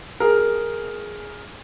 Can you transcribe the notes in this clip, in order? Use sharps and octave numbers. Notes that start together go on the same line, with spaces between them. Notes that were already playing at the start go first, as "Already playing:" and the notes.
G#4 A#4